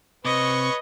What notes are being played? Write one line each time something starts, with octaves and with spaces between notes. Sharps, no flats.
C3 C4 B4 C#5 D#5 B5 C#6